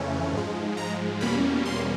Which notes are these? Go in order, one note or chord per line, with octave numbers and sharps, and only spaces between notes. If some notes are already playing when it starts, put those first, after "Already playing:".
Already playing: F2 C#3 E3 A3 C#4
G#2 F3 G#3
A#5
E2 B2 G3 A#3 C#4 B5
C6